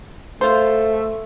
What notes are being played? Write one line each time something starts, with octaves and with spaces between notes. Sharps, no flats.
A3 F4 C5